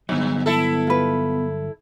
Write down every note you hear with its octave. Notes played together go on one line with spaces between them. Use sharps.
G1 G2 F#3 B3
E4 A4
F4 B4